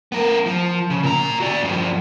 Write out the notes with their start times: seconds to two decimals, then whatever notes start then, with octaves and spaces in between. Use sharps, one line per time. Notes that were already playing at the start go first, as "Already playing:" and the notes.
0.12 B3 A#4
0.46 F3
0.90 C#3
1.03 A#2 A#5
1.40 F#4 D5
1.63 G2 F3